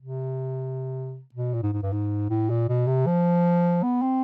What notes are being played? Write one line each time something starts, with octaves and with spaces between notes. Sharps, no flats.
C3
B2
A#2
G#2
G#2
G2
G#2
A2
A#2
B2
C3
F3
B3
C4